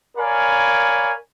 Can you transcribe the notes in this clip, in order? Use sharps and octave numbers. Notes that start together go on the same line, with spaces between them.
A#4 C#5 D5 F5 G#5 B5